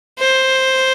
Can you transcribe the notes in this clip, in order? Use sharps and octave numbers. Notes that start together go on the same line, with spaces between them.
C5